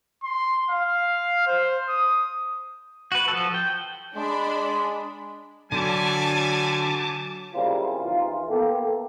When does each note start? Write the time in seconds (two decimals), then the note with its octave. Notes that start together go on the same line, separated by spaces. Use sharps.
0.24 C6
0.70 F5
1.47 C5
1.89 D#6
3.12 F#4 B4
3.28 F3 F#4 A4
3.54 G5
4.16 G#3 D4 B5
5.72 D3 F#3 G3 A3 G#5 A5 D6
7.54 C#3 G3 A#3 C4 E4 F4
8.04 A#1 E3 D#4 F4
8.49 A#3 B3 G4 A4